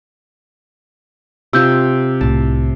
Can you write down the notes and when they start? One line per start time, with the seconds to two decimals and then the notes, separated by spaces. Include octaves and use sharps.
1.53 C3 F4 E6 G6
2.21 C2 A2 A5